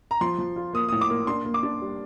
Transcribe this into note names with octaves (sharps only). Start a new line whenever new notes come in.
A#5
F3 C6
F3
F4
A#3 D#6
A2 D#6
D6
A#3
D4 C6
A#3
D6
D4
G3